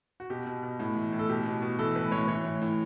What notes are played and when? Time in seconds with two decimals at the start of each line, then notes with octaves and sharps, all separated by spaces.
0.20 F#4
0.30 B2 G4
0.47 B2
0.63 B2
0.79 A2
0.96 E3
1.12 A2
1.19 A4
1.29 B2 G4
1.46 B2
1.62 B2
1.79 E3 A4
1.95 A2 B4
2.12 A2 C#5
2.28 E3 C#5
2.45 A2
2.62 A2